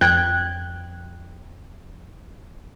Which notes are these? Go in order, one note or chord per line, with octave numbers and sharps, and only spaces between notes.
F2 G5 F#6 G#6